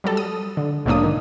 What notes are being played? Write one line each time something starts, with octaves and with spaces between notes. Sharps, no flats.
F#3 G3 A4
D#6
D3
B1 G#2 F#3 A#3 D4 D#6
D#3